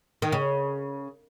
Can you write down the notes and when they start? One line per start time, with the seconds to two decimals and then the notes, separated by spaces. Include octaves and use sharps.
0.22 D#3
0.32 C#3